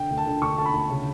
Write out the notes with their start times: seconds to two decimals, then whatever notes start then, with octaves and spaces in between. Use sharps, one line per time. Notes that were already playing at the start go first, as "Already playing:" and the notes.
Already playing: D3 G5
0.10 D2
0.17 A5
0.26 D3
0.41 D2 C#6
0.57 D3 A5
0.65 B5
0.74 D2
0.90 C#3